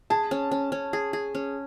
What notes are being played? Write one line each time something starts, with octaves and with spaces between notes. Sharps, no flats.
G#4 A5
C#4
C#4
C#4
G#4
G#4
C#4